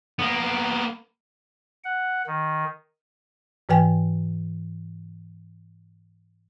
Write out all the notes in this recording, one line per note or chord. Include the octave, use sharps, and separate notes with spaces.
A#3 B3
F#5
D#3
G#2 E3 B4 G5 G#5